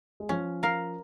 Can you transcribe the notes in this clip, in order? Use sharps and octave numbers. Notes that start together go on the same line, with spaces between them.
G#3
F3 C#4
A#4 F5